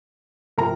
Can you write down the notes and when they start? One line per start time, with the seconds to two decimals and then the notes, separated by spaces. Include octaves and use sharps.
0.58 C3 F3 A#4 A#5